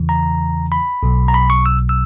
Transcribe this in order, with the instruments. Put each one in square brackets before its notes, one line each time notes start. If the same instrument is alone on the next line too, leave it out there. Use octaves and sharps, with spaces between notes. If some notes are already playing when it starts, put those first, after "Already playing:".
Already playing: [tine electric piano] E2 C#3 E3
A#5
B5
B1 B2 F#3
A#5
B5
C#6
E6
E6